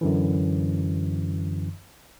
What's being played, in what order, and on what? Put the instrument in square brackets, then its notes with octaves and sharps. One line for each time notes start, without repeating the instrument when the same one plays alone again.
[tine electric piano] F#2 D3 E3